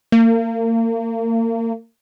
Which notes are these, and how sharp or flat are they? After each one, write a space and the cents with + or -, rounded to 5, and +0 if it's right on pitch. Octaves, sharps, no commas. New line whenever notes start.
A#3 -35